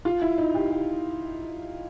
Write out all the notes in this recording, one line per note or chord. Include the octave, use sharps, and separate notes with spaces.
F4
E4
D#4
G4
G4